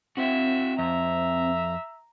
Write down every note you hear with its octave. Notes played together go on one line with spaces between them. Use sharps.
C4 E4 F#4 E5
F2 E5 A#5